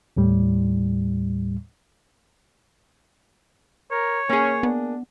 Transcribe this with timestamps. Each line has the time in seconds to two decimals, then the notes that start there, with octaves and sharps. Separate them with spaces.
0.17 D#2 A2 G3
3.91 A#4 C#5
4.30 A#3 C#4 G#4
4.63 B3 D4